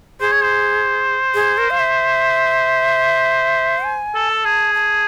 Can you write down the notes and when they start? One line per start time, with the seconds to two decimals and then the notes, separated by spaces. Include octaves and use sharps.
0.20 G#4 C5
0.32 C#5
0.43 C5
1.34 G#4
1.58 A#4
1.70 F5
1.79 E5
3.84 G#5
4.15 A4
4.30 A5
4.44 G#4
4.75 A5